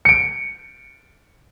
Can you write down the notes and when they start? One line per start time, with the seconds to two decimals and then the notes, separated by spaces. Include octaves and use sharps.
0.05 C#7 D7